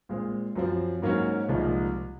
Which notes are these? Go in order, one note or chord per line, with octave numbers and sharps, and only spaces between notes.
A#2 G#3 C4
F#2 F3 C4
G#2 F#3 A#3 C#4 F#4
C2 A#2 F3 G#3 D#4